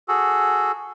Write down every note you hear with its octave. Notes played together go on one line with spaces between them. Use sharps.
F#4 G#4 A4